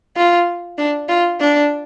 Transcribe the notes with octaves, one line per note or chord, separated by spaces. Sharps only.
F4
D4
F4
D4